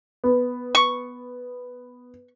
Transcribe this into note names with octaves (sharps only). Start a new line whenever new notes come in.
B3
C#6